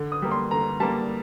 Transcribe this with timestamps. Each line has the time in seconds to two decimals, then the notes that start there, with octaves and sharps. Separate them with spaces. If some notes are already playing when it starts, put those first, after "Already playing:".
Already playing: D3
0.12 D#6
0.22 G3 A#3
0.31 C6
0.51 D3 A#5
0.80 G3 A#3 A5